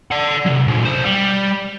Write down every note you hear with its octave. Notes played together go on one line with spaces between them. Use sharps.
D5 F#5
C3 F#3
A#2 G#3
B1 C5
G3